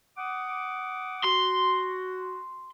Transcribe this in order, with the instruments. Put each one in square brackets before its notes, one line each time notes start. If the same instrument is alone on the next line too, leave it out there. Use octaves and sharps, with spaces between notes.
[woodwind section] F#5 D6 D#6
[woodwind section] F#4 [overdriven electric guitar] C6